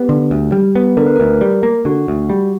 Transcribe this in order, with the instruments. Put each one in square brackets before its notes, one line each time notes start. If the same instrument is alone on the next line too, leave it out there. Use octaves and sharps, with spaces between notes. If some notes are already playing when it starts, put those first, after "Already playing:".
Already playing: [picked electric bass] B3 [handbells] G4
[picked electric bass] D3
D2
G3
B3
[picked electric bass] D3 [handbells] A#4
[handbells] B4
[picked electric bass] D2 [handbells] A#4
[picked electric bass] G3
A#3
[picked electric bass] D3 [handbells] F#4
[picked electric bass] D2
G3